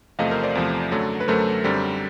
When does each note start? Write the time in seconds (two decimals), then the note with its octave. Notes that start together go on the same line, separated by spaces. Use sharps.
0.19 E2 C3 F3 A3 D#5 F5
0.31 A#4 C5
0.43 C5 D5
0.55 E2 C3 F3 A3
0.91 F#2 D3 F#3 A3
1.20 B4
1.28 F#2 D3 F#3 A3 A#4 C5
1.64 F#2 D3 G3 C4